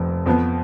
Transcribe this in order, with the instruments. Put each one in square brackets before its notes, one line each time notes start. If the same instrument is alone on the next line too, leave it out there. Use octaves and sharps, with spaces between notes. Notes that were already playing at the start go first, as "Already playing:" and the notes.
Already playing: [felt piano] F1 F2
F2 F3 B3